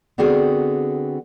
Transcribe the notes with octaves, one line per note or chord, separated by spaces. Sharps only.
D3 B3 C4 F#4 G#4 G5